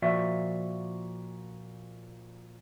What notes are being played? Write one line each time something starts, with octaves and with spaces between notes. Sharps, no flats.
A#2 F3 F#4 D5 E5